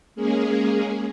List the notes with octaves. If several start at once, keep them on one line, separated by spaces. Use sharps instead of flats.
G#3 A#3 C#4 G#4